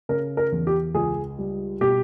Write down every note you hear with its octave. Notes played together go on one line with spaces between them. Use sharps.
C#3 A#4
A#4
E2
G4
C#2 G#4
G3
B2 G4